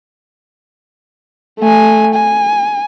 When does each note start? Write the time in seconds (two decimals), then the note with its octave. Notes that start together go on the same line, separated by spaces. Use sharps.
1.59 A3 G#5
2.14 G#5